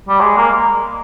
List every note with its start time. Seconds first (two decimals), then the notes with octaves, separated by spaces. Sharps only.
0.09 G3
0.21 G#3
0.37 A#3